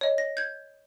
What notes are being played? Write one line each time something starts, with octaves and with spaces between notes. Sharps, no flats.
C#5 D#5
A#6
G6 G#6